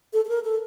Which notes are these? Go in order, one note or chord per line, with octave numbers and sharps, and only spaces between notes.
A4
A4
A#4
A4